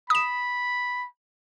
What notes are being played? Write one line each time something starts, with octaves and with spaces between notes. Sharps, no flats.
B5 D#6 E7